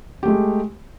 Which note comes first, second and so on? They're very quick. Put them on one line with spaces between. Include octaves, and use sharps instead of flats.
G4 A3 G#3